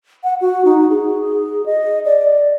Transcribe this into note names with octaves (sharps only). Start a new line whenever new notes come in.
F#5
F#4
D#4
G#4
D#5
D5